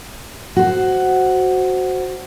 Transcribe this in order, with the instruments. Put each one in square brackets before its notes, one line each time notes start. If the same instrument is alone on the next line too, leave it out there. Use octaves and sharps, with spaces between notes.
[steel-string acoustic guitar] F#4 C5